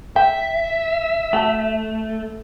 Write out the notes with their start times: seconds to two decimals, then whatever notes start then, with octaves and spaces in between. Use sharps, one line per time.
0.16 E5 G5
1.33 A3 F#4 A5